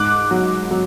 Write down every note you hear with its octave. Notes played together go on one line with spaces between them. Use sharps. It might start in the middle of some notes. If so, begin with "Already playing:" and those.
Already playing: G#2 D6 F#6
F#3
F#3